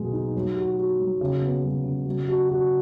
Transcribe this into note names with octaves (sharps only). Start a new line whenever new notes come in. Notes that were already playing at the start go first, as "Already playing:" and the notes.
Already playing: B1 B2 G#3
D#4
F#3
F#4
F#4
F#3
C#3
B3
F#3
C#3
F#3
F#4
F#4